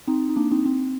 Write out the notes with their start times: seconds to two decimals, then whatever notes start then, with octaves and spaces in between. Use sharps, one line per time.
0.07 C4 D#4
0.29 D#4
0.36 A#3 D4
0.51 C4 D#4
0.66 C4